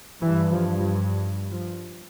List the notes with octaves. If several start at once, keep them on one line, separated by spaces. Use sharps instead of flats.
G2 E3
F3
F3
F3